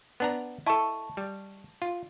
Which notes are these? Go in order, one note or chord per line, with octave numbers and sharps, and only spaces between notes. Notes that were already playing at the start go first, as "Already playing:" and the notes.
B3 D4 A#5
E4 A4 D#5 A5 C#6
G3
F4